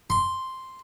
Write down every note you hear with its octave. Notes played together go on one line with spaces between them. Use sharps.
C6